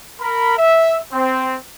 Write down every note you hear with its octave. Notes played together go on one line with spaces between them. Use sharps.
A#4 B5
E5
C4